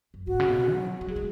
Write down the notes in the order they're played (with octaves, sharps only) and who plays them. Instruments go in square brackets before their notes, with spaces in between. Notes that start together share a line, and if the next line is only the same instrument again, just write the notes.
[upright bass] F#2
[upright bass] G#2 [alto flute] F#4
[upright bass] C#3
B2
F#3
G#3
[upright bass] F#3 [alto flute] G#4
[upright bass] G#3